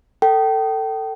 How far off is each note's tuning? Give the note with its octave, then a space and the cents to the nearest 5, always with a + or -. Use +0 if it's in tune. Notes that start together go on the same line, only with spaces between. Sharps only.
A4 +25 G5 -25